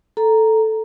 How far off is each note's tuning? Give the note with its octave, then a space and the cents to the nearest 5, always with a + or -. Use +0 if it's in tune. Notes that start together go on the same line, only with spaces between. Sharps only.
A4 +0 A#5 +0